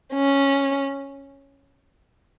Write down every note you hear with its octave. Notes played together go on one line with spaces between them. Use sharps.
C#4